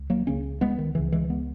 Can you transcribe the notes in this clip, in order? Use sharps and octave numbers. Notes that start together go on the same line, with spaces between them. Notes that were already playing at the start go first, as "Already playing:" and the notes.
Already playing: C#2
F#3 A#3
C#2 C#3 A#3 C#4
G#3 B3
D#3
C#2 C#3 E3
E3 G#3
G#3 B3